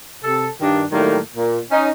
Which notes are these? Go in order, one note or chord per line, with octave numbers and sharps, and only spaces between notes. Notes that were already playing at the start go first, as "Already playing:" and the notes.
C3 A4
G2 D#3 D4
A2 D#3 F#3 G3 A3 A#3
A#2
C#4 D#4